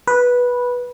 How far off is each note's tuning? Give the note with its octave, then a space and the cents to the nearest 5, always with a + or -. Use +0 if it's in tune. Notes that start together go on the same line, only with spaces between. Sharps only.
B4 -10